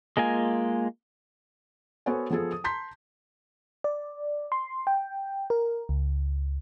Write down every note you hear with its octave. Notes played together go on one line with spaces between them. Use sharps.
G#3 A#3 F4 G#5
B3 F#4 A4 C5 C#5 G#5
F3 B3 G#4 A4
D#6
A5 A#5 C6 G6 B6
D5
C6
G5
A#4
C#2